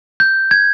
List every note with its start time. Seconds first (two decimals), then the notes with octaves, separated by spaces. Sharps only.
0.20 G6
0.51 G#6